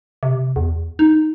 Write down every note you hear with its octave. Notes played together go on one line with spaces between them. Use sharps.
C3
E2
D#4